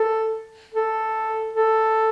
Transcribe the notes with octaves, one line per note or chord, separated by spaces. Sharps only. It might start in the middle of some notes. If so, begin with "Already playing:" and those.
Already playing: A4
A4
A4